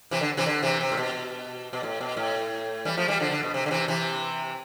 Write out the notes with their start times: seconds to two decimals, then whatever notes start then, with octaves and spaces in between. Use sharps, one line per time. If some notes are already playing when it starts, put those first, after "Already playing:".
0.11 C3 E3
0.21 D3
0.37 C3 E3
0.46 D3
0.63 C3 E3
0.81 C3
0.92 A2
0.97 B2
1.73 B2
1.83 A2
2.01 B2
2.17 A2
2.85 E3 G3
2.97 F3 A3
3.08 E3 G3
3.20 D3 F3
3.31 D3
3.43 B2
3.54 C3
3.66 D3
3.71 C3 E3
3.88 C3 E3